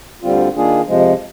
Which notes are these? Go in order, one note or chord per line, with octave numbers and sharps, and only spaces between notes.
D2 D3 G3 C4 F4
D#3 A#3 D4 F4 G#4
F2 C3 F3 G#3